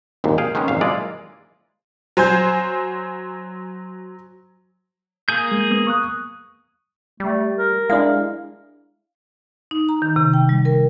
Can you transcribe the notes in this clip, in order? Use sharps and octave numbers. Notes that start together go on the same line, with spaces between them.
G#1 D#2 A#2
G#4 F5 G5
D#3 G#3 A#3 B3 C#4
G#1 F2 A#2 F5
G#3 A#3 E4 F4 D5
F#3 C5 G#5 G6
A#3 G#4 G6
G#3
B3 D#6
C#6 D#6 F#6
G3 A3
A#4
G#3 D4 E4 F5
D#4
A#5
D#3
C3
G5
G3
A#4